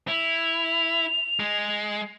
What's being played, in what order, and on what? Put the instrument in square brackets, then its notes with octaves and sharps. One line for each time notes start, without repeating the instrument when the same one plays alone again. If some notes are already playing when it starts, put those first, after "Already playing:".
[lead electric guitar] E4 [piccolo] F7
[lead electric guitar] G#3